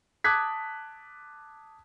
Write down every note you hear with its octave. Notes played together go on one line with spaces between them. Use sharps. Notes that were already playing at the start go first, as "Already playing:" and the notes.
A5 D6 D#6 F#6 G#6 B6